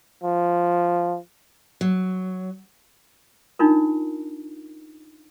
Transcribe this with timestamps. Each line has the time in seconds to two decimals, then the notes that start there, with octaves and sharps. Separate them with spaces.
0.23 F3
1.81 F#3
3.59 D4 D#4 F4 A#4